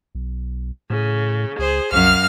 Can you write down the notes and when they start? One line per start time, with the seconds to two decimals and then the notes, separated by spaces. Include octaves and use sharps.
0.15 B1
0.90 A2 C#3
1.59 C#2 G#4 C5
1.92 C2 F#2 F5 F6